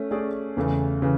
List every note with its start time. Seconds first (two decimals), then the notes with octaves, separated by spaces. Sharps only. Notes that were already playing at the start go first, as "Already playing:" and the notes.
Already playing: A3 C#4
0.11 A3 C#4 G#4 D5
0.57 E2 C#3 E3 A3
1.02 C#3 E3